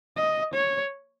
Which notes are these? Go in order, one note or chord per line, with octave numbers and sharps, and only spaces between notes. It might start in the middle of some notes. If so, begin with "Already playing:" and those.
D#5
C#5